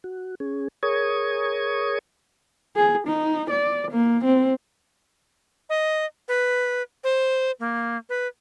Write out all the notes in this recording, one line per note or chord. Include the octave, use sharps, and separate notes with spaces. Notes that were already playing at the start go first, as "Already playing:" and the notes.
F#4
C#4 G#4
G#4 A#4 C#5 C#6 D#6 G#6
G#4
D#4
D5
A#3
C4
D#5
B4
C5
A#3
B4